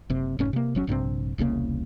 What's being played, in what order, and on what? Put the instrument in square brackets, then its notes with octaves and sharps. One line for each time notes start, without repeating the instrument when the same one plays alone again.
[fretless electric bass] F#1 C3
F1 G#2 C#4
C3 A#3
G1 F#3 C#4
A#1 G2 C3 C4
E1 C2 C#3 A#3